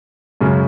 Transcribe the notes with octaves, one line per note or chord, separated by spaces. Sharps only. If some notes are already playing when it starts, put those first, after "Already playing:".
F#2 C#3 G#3